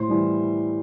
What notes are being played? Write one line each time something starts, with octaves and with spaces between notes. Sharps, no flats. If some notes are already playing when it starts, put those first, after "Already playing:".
Already playing: A2 C5
E3 G3